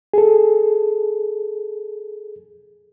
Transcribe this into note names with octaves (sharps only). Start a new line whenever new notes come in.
G#4 A4